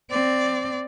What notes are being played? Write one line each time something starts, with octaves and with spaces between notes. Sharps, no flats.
C4 D5